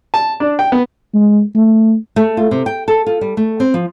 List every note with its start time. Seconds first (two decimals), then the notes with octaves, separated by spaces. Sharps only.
0.14 A5
0.40 D4
0.59 G5
0.72 B3
1.14 G#3
1.55 A3
2.16 A3
2.37 F4
2.51 C3
2.66 G5
2.88 A4
3.07 F4
3.21 G3
3.37 A3
3.60 C4
3.74 F3